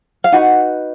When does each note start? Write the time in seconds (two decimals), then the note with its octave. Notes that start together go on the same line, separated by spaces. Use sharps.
0.24 F5
0.32 D#4 F#4 B4 F#5